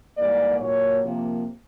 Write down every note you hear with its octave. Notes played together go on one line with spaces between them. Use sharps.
G#2 E3 G3 A#3 D5
A#2 F#3 A#3 C#5
C3 F3 A#3